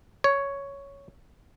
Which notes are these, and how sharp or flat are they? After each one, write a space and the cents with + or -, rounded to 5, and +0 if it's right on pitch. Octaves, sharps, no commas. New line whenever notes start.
C#5 +5